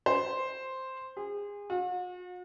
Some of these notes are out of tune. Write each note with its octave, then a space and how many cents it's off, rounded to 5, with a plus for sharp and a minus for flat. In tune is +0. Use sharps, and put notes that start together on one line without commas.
C5 +0
G#4 -30
F#4 -45